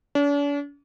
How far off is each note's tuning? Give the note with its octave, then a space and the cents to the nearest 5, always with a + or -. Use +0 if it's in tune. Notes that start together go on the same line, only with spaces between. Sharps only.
D4 -45